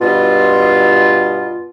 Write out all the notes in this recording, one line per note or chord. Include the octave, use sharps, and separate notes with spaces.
G2 B2 F4